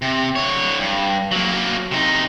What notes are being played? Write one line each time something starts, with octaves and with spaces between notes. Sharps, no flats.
C3
D3 C#5
G2
F#3 A#3
C3 D#4